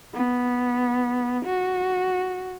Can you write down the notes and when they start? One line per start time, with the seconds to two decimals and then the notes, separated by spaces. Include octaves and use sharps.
0.14 B3
1.45 F#4